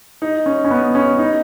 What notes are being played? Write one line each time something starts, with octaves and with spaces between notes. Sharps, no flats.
D#4
C#4
C#4
B3
C#4
D#4